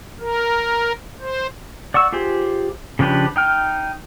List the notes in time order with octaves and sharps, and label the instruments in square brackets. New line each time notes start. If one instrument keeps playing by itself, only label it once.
[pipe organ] A#4
C5
[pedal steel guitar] D5 F#5 C#6 E6
F4 G4 G#4 C5
C#3 F3 D4 G4 B4
D#4 G5 F6